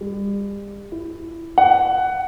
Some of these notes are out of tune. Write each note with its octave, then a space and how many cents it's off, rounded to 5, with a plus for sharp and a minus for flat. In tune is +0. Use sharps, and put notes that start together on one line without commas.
G3 +35
E4 +10
F#5 +10